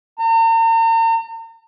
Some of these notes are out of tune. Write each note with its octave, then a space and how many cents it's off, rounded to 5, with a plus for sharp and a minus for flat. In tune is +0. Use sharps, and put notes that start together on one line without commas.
A#5 -45